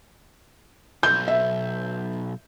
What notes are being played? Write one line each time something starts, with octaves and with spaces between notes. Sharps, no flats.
B1 G6
E5